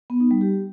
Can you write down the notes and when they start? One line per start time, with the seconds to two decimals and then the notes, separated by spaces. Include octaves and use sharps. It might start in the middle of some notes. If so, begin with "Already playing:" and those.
0.10 B3
0.20 D#4
0.31 G3
0.41 G4